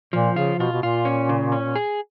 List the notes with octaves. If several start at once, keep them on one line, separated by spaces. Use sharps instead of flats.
A#2 F3
C#3 F4
B2 F4
B2
A#2 F4
C#4
C#3
C#4
G#4